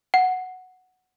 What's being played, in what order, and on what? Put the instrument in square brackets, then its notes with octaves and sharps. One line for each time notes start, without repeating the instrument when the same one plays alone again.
[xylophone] F#5